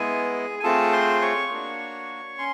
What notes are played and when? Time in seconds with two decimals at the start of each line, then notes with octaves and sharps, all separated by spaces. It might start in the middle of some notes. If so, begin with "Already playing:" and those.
Already playing: G#3 B3 E4 G#4 G#5
0.60 G#5
0.63 A3 C4 F4 G#4 A4 A5
0.92 C5 C6
1.21 C#5 C#6
1.51 A#3 D4 F#4
2.38 C#4 C6